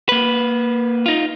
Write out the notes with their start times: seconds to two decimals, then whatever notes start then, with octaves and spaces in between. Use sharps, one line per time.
0.09 A#3 B4
1.06 D#4 F4